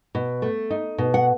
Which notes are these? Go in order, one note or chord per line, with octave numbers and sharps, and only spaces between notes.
B2
A3
D#4
B2
F#5